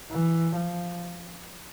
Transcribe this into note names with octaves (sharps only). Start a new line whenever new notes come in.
E3
F3